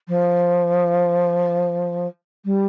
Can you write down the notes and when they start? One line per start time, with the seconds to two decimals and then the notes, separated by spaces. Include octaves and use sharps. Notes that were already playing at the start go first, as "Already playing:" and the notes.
0.08 F3
2.45 G3